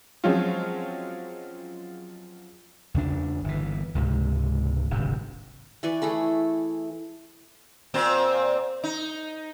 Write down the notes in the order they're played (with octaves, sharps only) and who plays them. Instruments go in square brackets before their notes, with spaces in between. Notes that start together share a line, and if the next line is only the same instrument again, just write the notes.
[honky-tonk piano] F3 F#3 G#3 C4 C#4 F4
[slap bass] E2 C#3 D4
G1 E3
C#2 G#2 C3
D1 G#1 G2 C3
[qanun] E3 D5 G#5 C#6
A3 E4 G#4 A4
[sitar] A#2 C4 C5
D#4